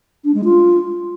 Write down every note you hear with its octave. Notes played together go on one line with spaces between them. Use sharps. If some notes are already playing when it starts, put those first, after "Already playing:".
D4
G#3
F4